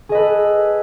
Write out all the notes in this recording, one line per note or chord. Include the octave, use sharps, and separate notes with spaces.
G#4 A4 B4 D#5